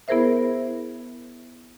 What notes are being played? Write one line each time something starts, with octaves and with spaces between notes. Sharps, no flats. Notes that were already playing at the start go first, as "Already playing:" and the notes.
B3 E4 G#4 A#4 C5 E5